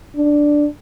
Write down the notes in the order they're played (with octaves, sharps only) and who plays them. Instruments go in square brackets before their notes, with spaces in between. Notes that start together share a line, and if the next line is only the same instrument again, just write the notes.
[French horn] D4